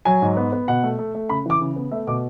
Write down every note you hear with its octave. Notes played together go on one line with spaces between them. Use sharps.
F#3 G#5
G#2
B3
B3
B2 F#5
A3
A3
A3
C#3 B5
E3 D6
C#3
B3
A3 E5
B2 D6